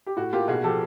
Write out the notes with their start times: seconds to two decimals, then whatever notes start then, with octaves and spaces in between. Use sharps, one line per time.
0.06 G4
0.16 A2 F#4
0.33 A#3 F4 G4
0.48 B1 F#4 G#4
0.64 F3 G4 A4